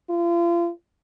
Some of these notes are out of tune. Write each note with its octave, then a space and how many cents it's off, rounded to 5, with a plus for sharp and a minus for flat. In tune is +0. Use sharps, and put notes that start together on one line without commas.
F4 -35